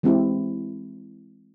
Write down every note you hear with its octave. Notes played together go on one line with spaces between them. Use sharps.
E3 G#3 C4 E4 G4